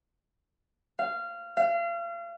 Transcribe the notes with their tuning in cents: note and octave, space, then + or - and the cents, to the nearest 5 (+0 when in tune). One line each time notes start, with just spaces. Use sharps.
F5 -20
F5 -35